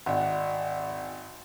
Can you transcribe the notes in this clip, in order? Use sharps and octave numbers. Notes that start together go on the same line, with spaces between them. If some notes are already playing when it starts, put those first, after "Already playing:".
G#1 D5 F#5